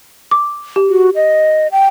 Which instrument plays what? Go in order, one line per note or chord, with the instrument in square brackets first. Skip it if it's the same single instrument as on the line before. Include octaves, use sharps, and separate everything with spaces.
[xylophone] D6
G4
[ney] F#4
D#5
G5